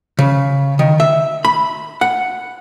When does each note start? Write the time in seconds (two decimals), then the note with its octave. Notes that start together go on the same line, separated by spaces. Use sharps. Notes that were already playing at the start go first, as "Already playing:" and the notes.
0.19 C#3
0.79 D#3
1.00 E5
1.45 B5
2.01 F#5